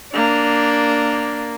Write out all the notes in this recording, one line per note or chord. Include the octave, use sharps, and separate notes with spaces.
A#3 D4